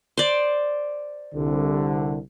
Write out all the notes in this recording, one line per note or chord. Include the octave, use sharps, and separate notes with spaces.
C5 D5
C2 D3